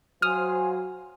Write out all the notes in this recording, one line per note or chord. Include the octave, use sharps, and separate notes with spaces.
F#3 C5 F5 G#5 D#6 F6